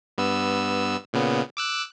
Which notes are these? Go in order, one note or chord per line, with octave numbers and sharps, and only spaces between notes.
G2 B3 E6
A#2 C#3 B3
D6 E6 F#6